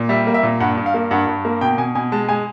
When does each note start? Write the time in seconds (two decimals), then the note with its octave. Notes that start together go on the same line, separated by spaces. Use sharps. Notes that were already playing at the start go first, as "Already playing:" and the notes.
Already playing: A#2
0.09 G3 E5
0.27 A#3
0.34 E5
0.43 A#2
0.60 G2 F#5
0.77 G2
0.86 F5
0.94 A#3
1.11 G2 F#5
1.27 G2
1.45 A#3
1.61 B2 G5
1.78 B2 G#5
1.95 B2 G#5
2.12 G#3 A5
2.28 G#3 G#5